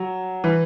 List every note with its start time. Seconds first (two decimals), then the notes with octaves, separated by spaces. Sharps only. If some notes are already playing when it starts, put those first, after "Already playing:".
Already playing: F#3
0.44 E3